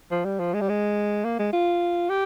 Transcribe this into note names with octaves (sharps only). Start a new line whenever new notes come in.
F3
G3
F3
G#3
G3
G#3
A#3
G#3
F4
G4